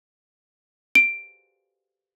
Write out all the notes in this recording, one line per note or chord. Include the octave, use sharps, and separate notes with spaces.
D7